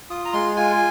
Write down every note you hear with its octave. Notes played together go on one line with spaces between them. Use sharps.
F4 D#6
A#5
G#3 C6
F4 G#5